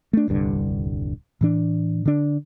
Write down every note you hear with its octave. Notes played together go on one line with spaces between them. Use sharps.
A3 D4
D#1 C2 G2 D3
A2 E3 D4
D3 D4